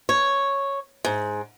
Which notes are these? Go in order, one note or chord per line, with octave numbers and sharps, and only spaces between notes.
C#5
G#2